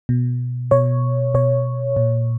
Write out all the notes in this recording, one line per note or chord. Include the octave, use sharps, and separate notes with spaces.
B2
B2 C#5
B2 C#5
A#2